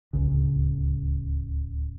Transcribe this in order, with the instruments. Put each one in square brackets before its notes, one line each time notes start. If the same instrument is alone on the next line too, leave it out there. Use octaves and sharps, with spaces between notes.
[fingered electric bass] D1 G1 C#2 C#3